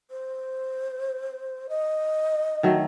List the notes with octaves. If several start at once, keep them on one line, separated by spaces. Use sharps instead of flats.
C5
D#5
D#3 F#3 A3